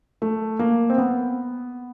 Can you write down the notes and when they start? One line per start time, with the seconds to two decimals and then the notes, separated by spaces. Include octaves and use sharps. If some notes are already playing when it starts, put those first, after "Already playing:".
0.22 A3
0.59 A#3
0.90 C4
0.98 B3